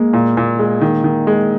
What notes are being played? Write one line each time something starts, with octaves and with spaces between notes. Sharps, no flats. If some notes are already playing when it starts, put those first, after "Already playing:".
Already playing: G#3 A#3
A#2
A#2
G#3
D#3
D#3
G#3